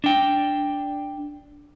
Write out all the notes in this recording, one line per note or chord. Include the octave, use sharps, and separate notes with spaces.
D4 G5